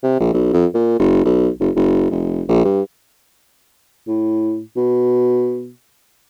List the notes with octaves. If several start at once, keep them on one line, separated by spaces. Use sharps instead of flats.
C3
A#1
B1
F2
A#2
F#1
B1
F#1
F#1
F1
A#1
G2
A2
B2